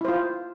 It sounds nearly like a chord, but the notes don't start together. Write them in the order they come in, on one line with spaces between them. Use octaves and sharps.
E4 C5 F4